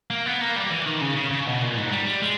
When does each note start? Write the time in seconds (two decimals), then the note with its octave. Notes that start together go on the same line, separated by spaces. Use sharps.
0.10 A#3
0.26 B3
0.41 A#3
0.56 G3
0.71 E3
0.86 D#3
1.01 C#3
1.16 C#3
1.31 C#3
1.46 B2
1.61 A#2
1.77 G#2
1.92 G3
2.07 G3
2.22 G#3